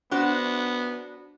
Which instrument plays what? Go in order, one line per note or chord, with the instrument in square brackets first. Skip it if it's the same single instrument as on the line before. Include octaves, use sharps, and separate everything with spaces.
[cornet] B3 [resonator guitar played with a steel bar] D4 F#4 C5